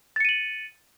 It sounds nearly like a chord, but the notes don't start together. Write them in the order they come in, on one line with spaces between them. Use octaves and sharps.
A6 C#7 D#7 F#7